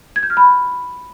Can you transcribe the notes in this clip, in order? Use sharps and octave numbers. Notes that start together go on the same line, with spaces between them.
G#6
G6
F6
B5